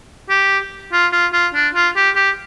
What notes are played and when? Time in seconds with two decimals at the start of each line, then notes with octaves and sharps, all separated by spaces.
0.29 G4
0.93 F4
1.12 F4
1.33 F4
1.54 D4
1.75 F4
1.96 G4
2.16 G4